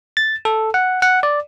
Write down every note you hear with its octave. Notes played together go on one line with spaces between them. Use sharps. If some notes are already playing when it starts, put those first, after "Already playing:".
A6
A4
F#5
F#5
D5